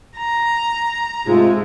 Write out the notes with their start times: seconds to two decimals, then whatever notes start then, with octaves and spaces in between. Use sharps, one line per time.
0.17 A#5
1.27 G#2 C3 G#3 A3 F4